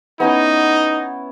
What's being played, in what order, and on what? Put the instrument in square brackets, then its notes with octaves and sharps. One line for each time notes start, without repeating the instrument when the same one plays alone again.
[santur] B3 C#4 E4 [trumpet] D#4